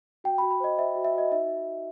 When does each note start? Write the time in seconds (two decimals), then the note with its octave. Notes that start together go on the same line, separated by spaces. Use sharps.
0.24 F#4 G5
0.38 B5
0.42 F#4
0.51 B5
0.60 C5 D#5
0.79 C5 E5
0.96 F#4
1.05 E5
1.14 F#4 D#5
1.32 D#4 E5